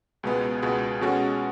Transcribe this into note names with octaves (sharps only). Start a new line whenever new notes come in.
C#2 B2 G#3 B3
C#2 B2 G#3 B3
B2 G#3 C#4 F#4 A4